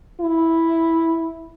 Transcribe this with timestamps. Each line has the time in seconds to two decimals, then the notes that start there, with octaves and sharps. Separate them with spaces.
0.21 E4